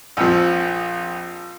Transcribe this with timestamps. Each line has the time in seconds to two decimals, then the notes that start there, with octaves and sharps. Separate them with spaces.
0.17 A#1 F2 F3